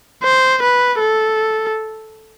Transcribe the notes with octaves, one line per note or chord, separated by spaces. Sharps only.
C5
B4
A4